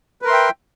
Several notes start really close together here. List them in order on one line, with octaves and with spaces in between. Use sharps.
B4 A#4 C6 E5 G5